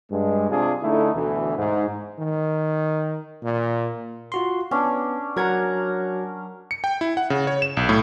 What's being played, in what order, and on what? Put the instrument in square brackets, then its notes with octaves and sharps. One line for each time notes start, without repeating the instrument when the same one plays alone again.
[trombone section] G2 G#3
C3 D4 F4 G#4
D3 A3 D#4 E4
D2 B2 E3
G#2
[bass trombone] D#3
A#2
[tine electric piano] F4 F#4 C6
[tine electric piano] B3 [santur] C#4 D4
[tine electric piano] F#3 G#6 [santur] A#4 F#5 A#5
[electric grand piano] C#7
G5
E4
F#5
C#3
C#5
E7
B1
A2